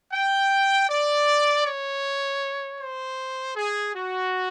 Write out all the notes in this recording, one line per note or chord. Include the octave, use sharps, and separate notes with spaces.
G5
D5
C#5
C5
G#4
F#4